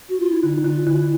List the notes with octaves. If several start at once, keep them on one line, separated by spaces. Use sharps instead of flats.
F#4
F4
E4
D3 D#4
D3 F4
D3 E4